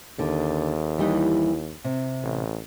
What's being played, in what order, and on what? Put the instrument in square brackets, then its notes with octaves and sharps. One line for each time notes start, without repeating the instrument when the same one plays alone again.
[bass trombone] D#2 [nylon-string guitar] D3
[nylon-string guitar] E3 G3 D#4
C3
[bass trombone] A1